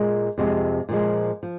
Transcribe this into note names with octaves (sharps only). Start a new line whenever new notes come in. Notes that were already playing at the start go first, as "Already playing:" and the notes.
Already playing: A#2 G#3
F2 C3 G#3
A#2 F3 G#3
F3